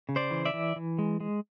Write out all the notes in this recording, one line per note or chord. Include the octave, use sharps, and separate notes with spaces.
C#3
C5 D5
E3
D5 E5
E3
E3
G#3
G#3